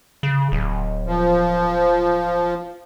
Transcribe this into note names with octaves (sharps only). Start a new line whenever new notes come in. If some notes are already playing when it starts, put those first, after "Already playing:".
C#3
D1
F3